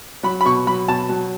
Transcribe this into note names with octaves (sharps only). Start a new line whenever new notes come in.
F#3 B5
B5
B2 C#6
F#3 B5
B2 A5
F#3